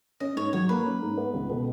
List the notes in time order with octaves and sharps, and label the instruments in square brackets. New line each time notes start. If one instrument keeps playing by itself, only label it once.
[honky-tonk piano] C#4 [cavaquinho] D#5
[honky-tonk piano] G#2 [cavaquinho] C#5
[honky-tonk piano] F#3 [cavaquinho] C#5
[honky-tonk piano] A#3 [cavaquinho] B4
[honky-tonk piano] C#4
G#2
B3
C#2
B2